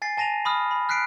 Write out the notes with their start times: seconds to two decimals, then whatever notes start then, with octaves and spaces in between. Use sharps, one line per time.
0.02 G#5 A6 C7
0.17 G#5 A5 A#6 D#7 F7
0.45 B5 D#6 F6
0.71 B5
0.89 F6 F#6 B6 C7 D7